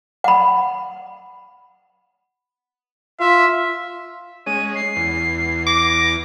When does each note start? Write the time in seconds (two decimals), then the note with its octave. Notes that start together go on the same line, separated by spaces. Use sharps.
0.24 F#5 B5
3.20 F4 E5
4.46 G#3 C#4 D#7
4.75 C7
4.96 E2
5.67 D6 A#6